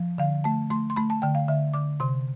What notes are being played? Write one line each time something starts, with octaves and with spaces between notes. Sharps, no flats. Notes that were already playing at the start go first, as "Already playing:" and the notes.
Already playing: F3
D3 F5
A3 A5
A3 C6
C6
A3 B5
A5
D3 G5
F5
D3 E5
D3 D6
C3 C6